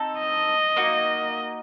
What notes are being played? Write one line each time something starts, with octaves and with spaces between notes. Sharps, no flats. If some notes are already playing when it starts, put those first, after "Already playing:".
Already playing: C4 D#4 A4
D#5
A#3 D#4 F#4